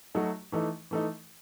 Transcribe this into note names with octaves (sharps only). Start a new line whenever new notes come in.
F#3 A3 D#4 F#4
E3 A3 D#4
E3 A3 D#4